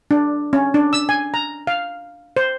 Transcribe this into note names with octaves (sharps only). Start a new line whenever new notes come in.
D4
C#4
D4
E6
G#5
A#5
F5
C5